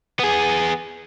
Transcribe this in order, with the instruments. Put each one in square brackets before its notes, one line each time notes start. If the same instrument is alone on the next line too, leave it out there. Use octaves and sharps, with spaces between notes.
[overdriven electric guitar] B3 G#4